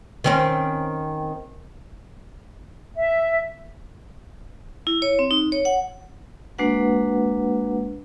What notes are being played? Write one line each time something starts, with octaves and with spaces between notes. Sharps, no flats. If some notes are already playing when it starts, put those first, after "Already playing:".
D#3 C4 C#4
E5
E4
C#5
C4
D#4
C#5
F#5
G#3 A#3 D4 F#4 B4 F#5